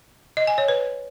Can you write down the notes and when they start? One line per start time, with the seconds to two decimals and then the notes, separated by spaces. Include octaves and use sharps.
0.37 D#5
0.47 G#5
0.58 C#5
0.68 B4